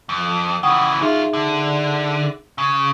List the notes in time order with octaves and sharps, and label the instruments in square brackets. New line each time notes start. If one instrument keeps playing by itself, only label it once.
[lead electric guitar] F2
[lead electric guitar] C#3 E3 [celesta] F#5 G5 D#6
[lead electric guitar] F#2 F4 [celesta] D#4 G#4 E5
[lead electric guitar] D3
C#3